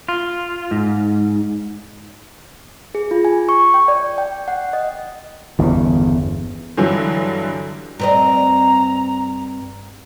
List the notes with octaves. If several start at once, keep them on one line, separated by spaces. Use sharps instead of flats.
F4
G#2
G#4
F4
G#5
C#6
G5
D5
G5
F#5
D#5
G1 E2 C#3
G2 D3 E3 F#3
G2 C4 D#5 A#5